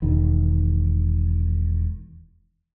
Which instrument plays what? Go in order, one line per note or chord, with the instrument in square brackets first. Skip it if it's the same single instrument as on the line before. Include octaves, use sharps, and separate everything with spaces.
[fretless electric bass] E1 D#3